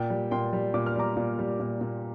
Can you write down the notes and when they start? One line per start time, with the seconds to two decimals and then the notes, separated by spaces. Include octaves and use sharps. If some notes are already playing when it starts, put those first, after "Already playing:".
Already playing: A#2 D5 G5
0.10 G3
0.31 A#2 G5 C6
0.53 G3
0.74 A#2 D6
0.86 F6
0.96 G3 A#5 D6
1.17 A#2
1.39 G3
1.60 A#2
1.81 A#2